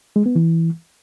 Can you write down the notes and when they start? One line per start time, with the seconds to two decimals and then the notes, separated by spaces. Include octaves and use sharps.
0.16 G#3
0.26 B3
0.36 E3